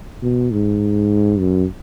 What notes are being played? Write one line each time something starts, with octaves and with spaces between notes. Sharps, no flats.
B2
G#2
F#2